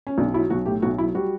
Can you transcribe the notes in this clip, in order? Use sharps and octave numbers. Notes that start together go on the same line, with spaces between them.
C#4
B1 D4
F#3 E4
B1 F#4
A2 G4
B1 F#4
F#3 E4
G3 F#4